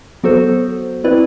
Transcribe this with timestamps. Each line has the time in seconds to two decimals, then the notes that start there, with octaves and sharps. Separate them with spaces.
0.23 F#3 B3 F#4 A4 C5
1.04 C4 E4 B4 D5